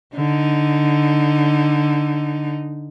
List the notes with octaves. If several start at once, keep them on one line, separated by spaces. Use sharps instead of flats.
D3 D#4